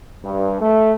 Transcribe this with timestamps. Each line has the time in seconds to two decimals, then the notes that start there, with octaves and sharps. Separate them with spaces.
0.24 G2
0.62 A3